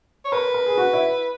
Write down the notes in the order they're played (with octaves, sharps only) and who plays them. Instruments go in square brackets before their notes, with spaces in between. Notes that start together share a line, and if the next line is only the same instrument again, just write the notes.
[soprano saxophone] C#5
[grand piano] A#4 [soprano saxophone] B4
[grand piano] A#4
G#4
F#4
E4